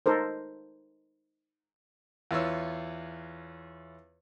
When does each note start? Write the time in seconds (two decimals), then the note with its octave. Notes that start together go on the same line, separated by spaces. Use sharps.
0.06 D#4 A4 A#4 C5
2.31 E2 F4 B4 C#5 E6